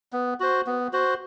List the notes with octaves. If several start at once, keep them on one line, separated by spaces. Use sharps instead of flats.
B3
F#4 C5
B3
F#4 C5